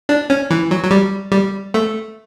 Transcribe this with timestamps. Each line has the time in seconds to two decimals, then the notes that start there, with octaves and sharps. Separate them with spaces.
0.09 D4
0.30 C#4
0.51 E3
0.71 F#3
0.84 F#3
0.91 G3
1.32 G3
1.74 A3